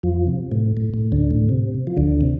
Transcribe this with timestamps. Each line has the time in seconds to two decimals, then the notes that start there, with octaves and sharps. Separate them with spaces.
0.03 F2 F3
0.27 C3
0.52 A2
0.77 A2
0.94 A2
1.12 D2 D3
1.31 A2
1.49 C3
1.87 F3
1.97 D2 D3
2.21 C3